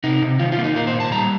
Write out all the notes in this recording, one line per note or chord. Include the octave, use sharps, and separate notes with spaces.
C3 D#4
C3
D#3 F4
F4
A#3
D#4
A#2 A#4
C5
A#2
A5
G3 A#5